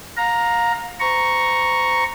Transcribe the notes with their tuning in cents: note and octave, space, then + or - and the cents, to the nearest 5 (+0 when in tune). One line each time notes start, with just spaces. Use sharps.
F5 +30 A#5 +0
C5 -35 A#5 +0 C#6 +0